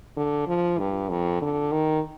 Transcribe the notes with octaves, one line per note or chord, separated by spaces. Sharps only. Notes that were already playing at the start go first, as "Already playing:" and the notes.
D3
F3
G2
F2
D3
D#3